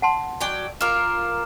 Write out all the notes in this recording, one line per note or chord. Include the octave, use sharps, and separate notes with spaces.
F#5 A5 C6
F#3 D5 G5
F4 A#4 D6 F6 E7